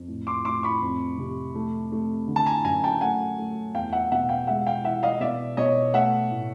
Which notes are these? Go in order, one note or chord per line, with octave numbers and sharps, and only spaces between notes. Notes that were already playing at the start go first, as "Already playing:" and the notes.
Already playing: F2
A2
C6 D6
A2 C6 D6
B5 C#6
F2
C3
A3
A3
D3
A5
G#5 A#5
F#2 G#5 A#5
G5 A5
A3 F#5 G#5
A3
E2 F5 G5
E5 F#5
B2 E5 F#5
F5 G5
G#3 E5 F#5
F5 G5
E3 E5 F#5
D#5 F5
B2 D5 E5
B2 C#5 D#5
A3 E5 F#5
A2